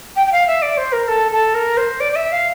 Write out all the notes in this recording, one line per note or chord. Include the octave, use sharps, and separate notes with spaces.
G5
G5
F5
E5
D5
C5
A#4
A4
A4
A#4
C5
D5
D5
E5
F5